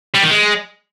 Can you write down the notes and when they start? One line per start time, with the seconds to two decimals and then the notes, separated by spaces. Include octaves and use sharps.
0.14 G3
0.22 D#3
0.30 G#3